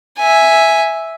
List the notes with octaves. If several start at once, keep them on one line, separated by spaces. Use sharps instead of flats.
E5 G#5